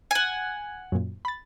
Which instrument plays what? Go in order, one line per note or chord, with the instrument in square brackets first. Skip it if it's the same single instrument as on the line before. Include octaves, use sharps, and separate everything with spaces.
[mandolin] F#5 G#5
[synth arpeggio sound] F#2 A#2
B5 A6